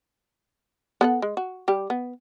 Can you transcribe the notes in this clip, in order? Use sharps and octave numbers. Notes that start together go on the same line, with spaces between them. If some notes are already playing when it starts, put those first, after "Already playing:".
B3 A4 F#5
G#3
F#4
G3 G4
B3